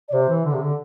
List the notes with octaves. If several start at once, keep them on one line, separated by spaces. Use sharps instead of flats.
D5
C3 C5
E3
D3
C3
D3